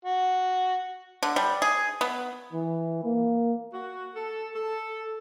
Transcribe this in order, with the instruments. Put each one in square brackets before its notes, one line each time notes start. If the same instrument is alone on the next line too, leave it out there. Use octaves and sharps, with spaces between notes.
[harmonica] F#4
[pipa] D3
G3
G#4
B3
[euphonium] E3
A#3
[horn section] F#4
A4
A4